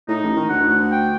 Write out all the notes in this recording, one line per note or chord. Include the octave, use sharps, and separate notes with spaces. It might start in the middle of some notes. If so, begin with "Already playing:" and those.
A2 D#4
A1
D#3
D2 F#5
D2
G5